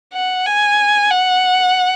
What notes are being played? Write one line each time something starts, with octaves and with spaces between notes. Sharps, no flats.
F#5
G#5
F#5